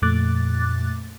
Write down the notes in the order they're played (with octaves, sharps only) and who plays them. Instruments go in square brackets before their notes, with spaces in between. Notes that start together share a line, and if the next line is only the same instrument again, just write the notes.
[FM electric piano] F2 A#2 A3 D6 F#6 A6